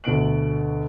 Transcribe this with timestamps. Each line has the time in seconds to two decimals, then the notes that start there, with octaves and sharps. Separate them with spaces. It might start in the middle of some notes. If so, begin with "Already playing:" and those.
0.04 D2 B2 D7 F#7